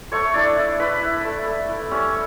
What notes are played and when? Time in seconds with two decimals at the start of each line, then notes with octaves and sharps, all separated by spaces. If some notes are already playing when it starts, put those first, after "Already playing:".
0.12 A3 C#5 C#6
0.34 D4 E4 D5
0.57 E4
0.80 E4 B4 B5
1.01 E4
1.25 A3
1.46 A3
1.68 E4
1.91 G3 C#4 C#5